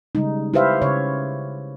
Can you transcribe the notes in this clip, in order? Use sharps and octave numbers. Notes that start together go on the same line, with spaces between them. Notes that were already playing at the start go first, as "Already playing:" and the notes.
C#3 G3 G#3 D#4
E4 G4 B4 C5 E5 F5
C#3 C#5